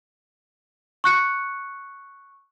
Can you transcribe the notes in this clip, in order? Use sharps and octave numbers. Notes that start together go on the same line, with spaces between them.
C#6 F#6 C#7